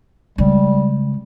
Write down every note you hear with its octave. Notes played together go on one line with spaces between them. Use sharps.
C#3 G3 G#3